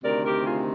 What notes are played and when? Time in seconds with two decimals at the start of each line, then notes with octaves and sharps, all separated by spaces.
0.04 D2 C3 D#3 A#4 D5
0.25 G4 A#4
0.45 F4 G#4